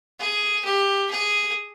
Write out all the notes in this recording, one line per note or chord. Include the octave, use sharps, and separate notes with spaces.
G#4
G4
G#4